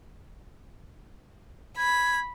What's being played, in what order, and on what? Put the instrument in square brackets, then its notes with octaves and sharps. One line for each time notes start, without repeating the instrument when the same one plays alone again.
[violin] B5 [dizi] G#6